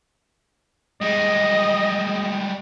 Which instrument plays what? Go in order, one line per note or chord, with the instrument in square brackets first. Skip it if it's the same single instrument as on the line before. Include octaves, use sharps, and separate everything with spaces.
[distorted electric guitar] G3 G#3 [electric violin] D#5